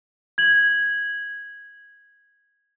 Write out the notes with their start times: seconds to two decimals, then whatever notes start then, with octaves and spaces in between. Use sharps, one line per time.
0.38 G#6 F#7